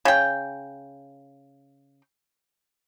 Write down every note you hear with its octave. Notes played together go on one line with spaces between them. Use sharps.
C#3 G5